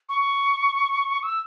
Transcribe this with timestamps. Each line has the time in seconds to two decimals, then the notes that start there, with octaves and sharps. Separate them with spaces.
0.09 C#6
1.23 E6